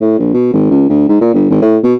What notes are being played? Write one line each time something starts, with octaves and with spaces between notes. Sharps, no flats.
A2
A#1
B2
G#1
C#2
D2
G#2
A#2
G1
G#1
A2
B2